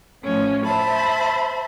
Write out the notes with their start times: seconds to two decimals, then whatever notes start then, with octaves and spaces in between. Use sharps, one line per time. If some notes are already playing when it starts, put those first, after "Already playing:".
0.23 A2 F3 C#4
0.65 C5 E5 A5 B5